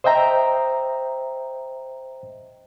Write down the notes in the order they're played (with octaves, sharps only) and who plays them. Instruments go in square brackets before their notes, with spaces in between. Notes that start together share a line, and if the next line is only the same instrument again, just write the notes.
[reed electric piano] C5 D#5 E5 G5 A#5